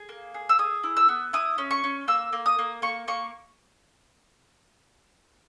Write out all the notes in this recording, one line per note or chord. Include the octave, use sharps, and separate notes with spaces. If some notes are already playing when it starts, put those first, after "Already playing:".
Already playing: G#4
A#3
G#4
E6
G#4 D#6
E4
E6
B3
E4 D#6
C#4
C#6
C#4
A#3 E6
A#3
D#6
A#3
A#3 C#6
A#3 C#6